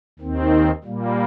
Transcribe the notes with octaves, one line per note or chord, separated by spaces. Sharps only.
D#2 D#3 C4
A#2 G3 A#3